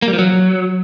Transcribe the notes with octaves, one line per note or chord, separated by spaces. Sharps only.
A#3
G3
F3
F#3